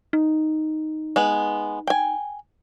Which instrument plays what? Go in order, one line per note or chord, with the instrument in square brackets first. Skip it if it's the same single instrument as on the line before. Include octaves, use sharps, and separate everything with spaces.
[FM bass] D#4
[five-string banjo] G#3 B3
G5 G#5